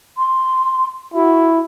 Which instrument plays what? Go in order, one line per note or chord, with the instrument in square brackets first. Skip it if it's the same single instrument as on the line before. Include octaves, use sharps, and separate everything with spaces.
[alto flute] C6
[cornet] E4 [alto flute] F#4